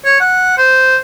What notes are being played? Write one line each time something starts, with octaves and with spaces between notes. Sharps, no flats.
C#5
F#5
C5